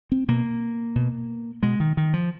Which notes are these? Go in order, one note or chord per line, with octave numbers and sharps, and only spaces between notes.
C4
B2 A#3
B2
B2 G#3
D#3
D#3
F3